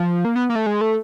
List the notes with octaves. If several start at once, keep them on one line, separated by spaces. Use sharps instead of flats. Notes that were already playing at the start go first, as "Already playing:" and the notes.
Already playing: F3
A#3
B3
A#3
A3
G#3
A3